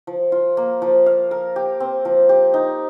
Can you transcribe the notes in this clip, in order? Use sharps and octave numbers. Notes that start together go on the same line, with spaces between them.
F3
F4
A#3
F3
F5
A#4
G4
C4
F3
G4
D#4